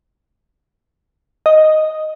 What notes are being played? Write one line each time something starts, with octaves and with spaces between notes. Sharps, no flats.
D#5